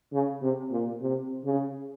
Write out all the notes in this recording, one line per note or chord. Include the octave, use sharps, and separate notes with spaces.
C#3
C3
A#2
C3
C#3